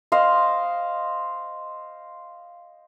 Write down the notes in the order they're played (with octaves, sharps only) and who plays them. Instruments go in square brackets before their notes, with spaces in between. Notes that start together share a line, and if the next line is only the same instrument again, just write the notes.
[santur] C5 D#5 F5